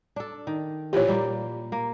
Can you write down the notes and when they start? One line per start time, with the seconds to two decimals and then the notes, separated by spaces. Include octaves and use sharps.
0.16 D4 A4
0.47 D#3
0.93 A#2 E3 F3 G4 C#5
1.07 A#2 G3 A#3
1.72 A#3